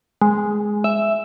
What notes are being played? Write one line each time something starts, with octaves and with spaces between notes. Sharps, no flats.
G#3
E5